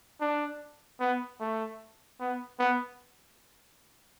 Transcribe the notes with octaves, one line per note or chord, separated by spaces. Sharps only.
D4
B3
A3
B3
B3